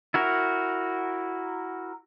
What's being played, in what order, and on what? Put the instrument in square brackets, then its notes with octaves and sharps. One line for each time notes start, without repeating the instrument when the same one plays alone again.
[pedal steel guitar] E4 F#4 A#4